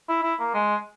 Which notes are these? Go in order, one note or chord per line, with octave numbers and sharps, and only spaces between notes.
E4
E4
A#3
G#3